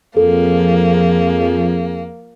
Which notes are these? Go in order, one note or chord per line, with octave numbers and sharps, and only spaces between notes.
F2 F3 A#3 G#4 A4